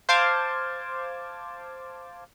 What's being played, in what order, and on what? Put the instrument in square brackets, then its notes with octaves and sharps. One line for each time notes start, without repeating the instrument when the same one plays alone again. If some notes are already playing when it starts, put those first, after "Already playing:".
[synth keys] C5 F5 A5 D6 G#6